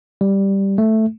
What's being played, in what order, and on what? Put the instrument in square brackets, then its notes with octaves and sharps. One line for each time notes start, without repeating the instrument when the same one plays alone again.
[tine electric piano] G3
A3